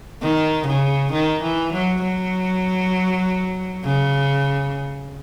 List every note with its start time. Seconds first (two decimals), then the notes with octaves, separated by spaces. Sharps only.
0.21 D#3
0.67 C#3
1.12 D#3
1.42 E3
1.73 F#3
2.03 F#3
3.84 C#3